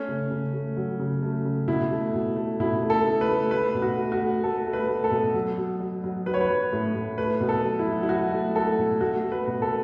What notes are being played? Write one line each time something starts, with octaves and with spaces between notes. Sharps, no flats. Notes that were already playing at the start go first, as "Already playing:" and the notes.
Already playing: A3 C#4
C#3
C#3
A3
F#3
C#3
A3
C#3
B2 E4
A3
B2
A3
B2 E4
A3
A4
A3
B4
A3
A3 B4
B2
F#4
A3
F#4
A3
A3 A4
A3
B4
A3
A4
B2
F#3
F#3
F#3
F#3
F#3 B4
C#5
B4
F#3
A2
A2
A3 B4
B2
A4
F#3
E4
F#3
E4
F#3 F#4
A3
A3 A4
B2
A3 F#4
A3
B4
B2
A4